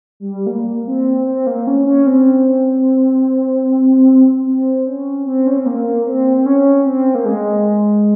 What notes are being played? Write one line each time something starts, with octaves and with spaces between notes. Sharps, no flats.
G3
A#3
C4
C4
A#3
C#4
C#4
C4
C4
C#4
C4
C#4
C4
A#3
C4
C4
C#4
C4
A#3
G#3